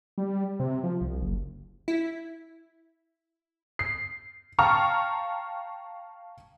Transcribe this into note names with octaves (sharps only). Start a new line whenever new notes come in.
G3
C3
F3
C2
F#1
E4
C7
F5 G5 A5 A#5 C#6 F6